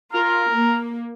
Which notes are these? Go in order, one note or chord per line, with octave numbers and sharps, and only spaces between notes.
F4 A#5 F6
A#3